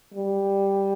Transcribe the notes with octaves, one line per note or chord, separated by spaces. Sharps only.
G3